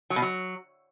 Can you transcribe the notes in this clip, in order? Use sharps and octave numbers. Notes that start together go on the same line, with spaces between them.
F#3
B2
F#3